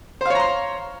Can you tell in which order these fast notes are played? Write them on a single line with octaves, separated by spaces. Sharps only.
C5 F5 C#5 A#5 C6